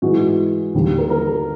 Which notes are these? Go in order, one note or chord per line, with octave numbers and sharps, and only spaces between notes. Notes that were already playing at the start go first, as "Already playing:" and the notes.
G#2 E3 G#3 F#4
D#2 D3 G3
A#4
A#4
A4